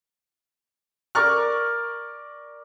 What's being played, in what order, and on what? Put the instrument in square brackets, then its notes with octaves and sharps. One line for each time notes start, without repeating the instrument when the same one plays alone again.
[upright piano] A#4 D5 C#6 F6